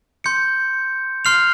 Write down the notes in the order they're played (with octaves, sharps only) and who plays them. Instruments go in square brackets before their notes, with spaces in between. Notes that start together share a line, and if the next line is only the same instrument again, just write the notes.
[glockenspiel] C6 G6 C#7
C6 F6 C7 F7